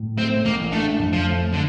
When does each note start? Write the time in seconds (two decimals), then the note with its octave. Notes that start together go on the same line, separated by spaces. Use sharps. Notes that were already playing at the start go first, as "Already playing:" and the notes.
Already playing: A2
0.18 A3 C4
0.45 A1 A#3
0.72 A3 D4
0.99 F2
1.13 F3
1.26 A3
1.54 D3